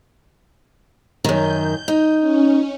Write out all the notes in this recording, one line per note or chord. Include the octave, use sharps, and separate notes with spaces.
F#2 D#3 G6
D#4
C#4